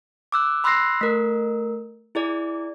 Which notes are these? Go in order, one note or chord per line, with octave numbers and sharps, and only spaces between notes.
D6 E6 F#6
B5 C6 E6 F#6 A#6 C7
A3 A#4
E4 G#4 D5